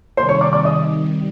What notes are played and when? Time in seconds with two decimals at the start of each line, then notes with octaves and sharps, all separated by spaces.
0.17 C3 D#3 G3 C5 C6
0.29 C#5 C#6
0.41 D5 D6
0.53 D5 D6
0.65 D#5 D#6